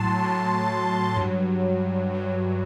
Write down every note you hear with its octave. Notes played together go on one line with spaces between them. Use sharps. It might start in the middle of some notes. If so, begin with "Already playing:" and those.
Already playing: A2 F#3 A5 C6
A2 F#3
G2 F#3
G2 F#3